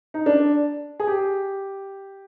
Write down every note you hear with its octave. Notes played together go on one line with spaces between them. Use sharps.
D#4
D4
G#4
G4